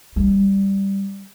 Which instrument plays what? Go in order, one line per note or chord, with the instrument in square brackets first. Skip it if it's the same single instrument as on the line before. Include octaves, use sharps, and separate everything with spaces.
[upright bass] G3